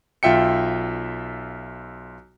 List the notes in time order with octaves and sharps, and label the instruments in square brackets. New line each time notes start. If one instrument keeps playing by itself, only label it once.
[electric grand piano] B1 F4 E5 G5 C#7